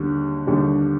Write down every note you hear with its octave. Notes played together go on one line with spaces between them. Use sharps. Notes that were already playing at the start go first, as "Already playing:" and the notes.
Already playing: D#2 D3 G3
D#2 D3 G3